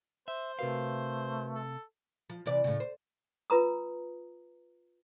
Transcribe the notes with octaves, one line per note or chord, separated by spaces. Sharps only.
C5 E5
C3 A3 F#4 A#4 B4 F5
A4
F3
C3 E3 D5
A2 C#3
C5
F4 B4 A#5 D#6